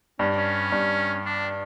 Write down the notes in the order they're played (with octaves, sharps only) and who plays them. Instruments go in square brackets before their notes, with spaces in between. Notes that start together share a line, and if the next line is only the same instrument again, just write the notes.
[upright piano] G2 [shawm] C#4
[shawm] C#4
[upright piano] G2
[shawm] D4